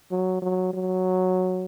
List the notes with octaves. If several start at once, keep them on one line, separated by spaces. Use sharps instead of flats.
F#3
F#3
F#3